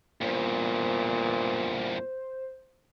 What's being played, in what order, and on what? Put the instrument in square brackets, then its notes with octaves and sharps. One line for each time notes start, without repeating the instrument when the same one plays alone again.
[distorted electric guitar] E2 G2 [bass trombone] A#2 [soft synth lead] C5